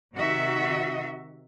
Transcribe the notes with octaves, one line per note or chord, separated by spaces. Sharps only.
C3 D#3 F#4 E5